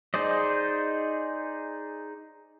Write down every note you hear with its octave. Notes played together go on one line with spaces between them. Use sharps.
D#4 G#4 C5 D5 D#5